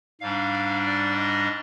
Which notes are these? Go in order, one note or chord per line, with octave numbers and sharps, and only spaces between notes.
G#2 G3 D4 F5
D5
D#5